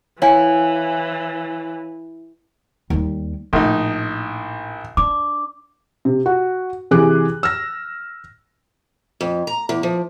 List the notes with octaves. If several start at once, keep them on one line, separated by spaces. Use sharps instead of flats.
E3 E4 C#5 F5 G#5
D#2 G3
A#1 A2 D#4
D4 D6
C3
F#4
C3 E3 G#4 D6 F#6
E6 F6 A#6
F2
A#5
E2
F3